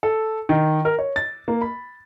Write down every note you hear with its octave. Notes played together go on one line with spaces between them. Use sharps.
A4
D#3
A#4
C#5
A6
A#3
B5